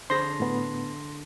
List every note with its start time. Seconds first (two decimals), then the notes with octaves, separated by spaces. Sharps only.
0.10 D3 G#4 C5 B5 C6 A#6
0.40 A2 B3